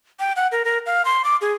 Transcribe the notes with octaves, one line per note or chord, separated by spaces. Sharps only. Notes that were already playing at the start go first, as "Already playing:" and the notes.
G5
F#5
A#4
A#4
F5
C6
D6
G#4